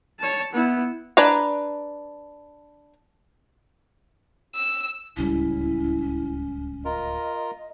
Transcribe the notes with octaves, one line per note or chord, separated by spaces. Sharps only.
C#5 A5
B3 E4
D4 B4 G#5 A#5
E6
D1 C#2 G3 C#4 E4
F4 A#4 D#5